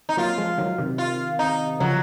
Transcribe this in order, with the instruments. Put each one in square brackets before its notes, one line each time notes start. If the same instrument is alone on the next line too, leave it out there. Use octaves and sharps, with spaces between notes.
[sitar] D#4
[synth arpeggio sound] F#3 A#3 [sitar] F4
[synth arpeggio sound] F3 G#3
D#3 F#3
C3 D#3
[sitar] F4
D#4
[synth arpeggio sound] C#3 F3 [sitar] F#3